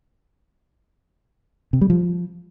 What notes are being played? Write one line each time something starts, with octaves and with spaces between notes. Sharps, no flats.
C3
G3
F3